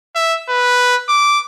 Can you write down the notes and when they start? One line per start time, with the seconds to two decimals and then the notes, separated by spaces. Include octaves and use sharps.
0.16 E5
0.49 B4
1.09 D6